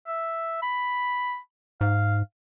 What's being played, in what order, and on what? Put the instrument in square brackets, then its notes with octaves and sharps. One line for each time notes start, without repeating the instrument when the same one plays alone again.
[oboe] E5
B5
[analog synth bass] G#2 [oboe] F5